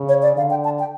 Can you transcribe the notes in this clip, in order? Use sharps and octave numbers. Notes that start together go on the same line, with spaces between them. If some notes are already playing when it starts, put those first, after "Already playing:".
Already playing: C#3
C#5
D5
D3 F5
G5
A5
G5